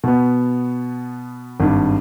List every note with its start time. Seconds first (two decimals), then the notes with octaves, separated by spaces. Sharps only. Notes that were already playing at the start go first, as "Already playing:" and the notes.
0.04 B2 B3
1.60 G#1 G2